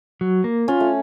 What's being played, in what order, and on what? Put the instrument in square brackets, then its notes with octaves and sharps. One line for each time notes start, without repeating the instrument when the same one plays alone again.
[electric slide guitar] F#3
A#3
[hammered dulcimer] C#4 [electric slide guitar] F4
[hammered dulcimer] A3